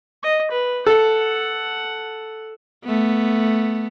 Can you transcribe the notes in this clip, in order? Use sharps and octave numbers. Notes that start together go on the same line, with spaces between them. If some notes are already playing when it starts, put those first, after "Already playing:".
D#5
B4
A4 F#5
A3 B3